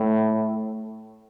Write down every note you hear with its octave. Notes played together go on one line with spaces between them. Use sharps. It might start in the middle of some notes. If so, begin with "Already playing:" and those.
Already playing: A2